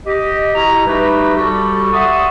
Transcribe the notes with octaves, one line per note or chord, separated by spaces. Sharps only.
G4 D#5
B2 E4 A#5
G3 A3 D#4 F#4 G4 B4
G3 F#4 G4 A4
D5 E5 F#5 C6 C#6 D#6